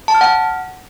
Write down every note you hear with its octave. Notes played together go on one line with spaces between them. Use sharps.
A5
F6
F#5